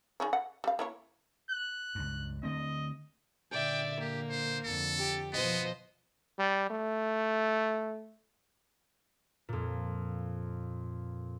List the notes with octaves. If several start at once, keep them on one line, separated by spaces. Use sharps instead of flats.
D#3 G#4 C#5
F#5
G3 F5
A#3 E4 C#5
F#6
C#2 G2
D3 A3 C4 D#5
A#2 D3 D5 E5 G5
A#3 G4
C5
F2 D3 A4
G4
B2 F3 B3 C5 D#5
G3
A3
F2 A#2